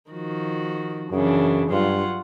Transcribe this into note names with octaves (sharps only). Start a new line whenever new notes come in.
D#3 F3 F#4
F#2 C#3 E3 D4
G2 F#3 F4 F#5